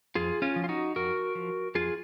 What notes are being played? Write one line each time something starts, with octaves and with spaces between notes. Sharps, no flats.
F2 F4 G#4
C#4 F4
F3
F4
D#4 F#4
F2 F#4 A#4
F3
F2 F4 G#4